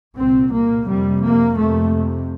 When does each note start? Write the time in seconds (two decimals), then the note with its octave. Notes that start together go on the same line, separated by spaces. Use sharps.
0.17 C2 A#2 C4
0.52 A#3
0.87 F2 C3 G3
1.22 A#3
1.57 F2 C3 A3